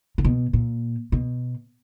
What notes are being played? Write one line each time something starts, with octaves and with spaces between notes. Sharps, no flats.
C3
B2
A#2
B2